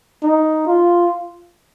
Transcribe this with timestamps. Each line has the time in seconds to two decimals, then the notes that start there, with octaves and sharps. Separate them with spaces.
0.23 D#4
0.67 F4